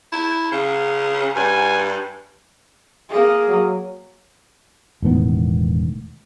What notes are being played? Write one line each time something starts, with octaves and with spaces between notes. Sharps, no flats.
E4
C#3
G2 G#5
A#3 G#4
F#3
E1 A2 D#3 B3